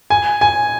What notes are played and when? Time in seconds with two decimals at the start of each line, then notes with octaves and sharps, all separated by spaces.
0.10 G#5
0.41 G#5